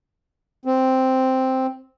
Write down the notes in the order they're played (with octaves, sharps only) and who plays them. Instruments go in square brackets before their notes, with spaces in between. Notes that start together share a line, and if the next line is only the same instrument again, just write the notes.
[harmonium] C4